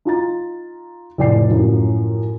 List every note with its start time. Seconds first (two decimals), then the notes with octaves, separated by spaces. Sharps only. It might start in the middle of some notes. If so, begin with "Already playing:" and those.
0.05 D#4 F4 A#5 A6
1.18 F1 A2 D5 G5 C7
1.50 F#2 A2 F3